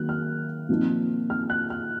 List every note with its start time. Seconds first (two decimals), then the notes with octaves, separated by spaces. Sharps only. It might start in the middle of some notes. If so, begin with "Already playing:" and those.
Already playing: D#3 F#3 A#3 F#6
0.09 F6
0.69 A#2 F3 C4 D#4
1.30 F6
1.50 F#6
1.70 F6